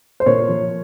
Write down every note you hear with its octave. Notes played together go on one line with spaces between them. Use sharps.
C5
A#2 A#4 C#5
F3